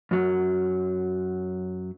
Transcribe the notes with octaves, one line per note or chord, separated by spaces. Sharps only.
F#2 F#3